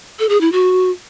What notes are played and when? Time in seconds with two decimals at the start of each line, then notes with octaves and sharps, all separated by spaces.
0.19 A4
0.29 G#4
0.41 E4
0.52 F#4